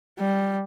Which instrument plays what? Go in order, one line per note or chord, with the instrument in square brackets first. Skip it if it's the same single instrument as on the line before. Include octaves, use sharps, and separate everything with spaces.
[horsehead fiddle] G3